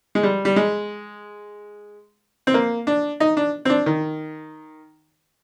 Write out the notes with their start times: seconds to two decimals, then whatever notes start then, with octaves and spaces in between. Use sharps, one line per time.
0.15 G#3
0.23 G3
0.45 G3
0.56 G#3
2.47 C4
2.54 A#3
2.87 D4
3.20 D#4
3.37 D4
3.65 C4
3.70 D4
3.86 D#3